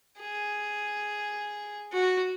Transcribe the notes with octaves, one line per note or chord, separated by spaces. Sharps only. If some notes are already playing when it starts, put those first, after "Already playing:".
G#4
F#4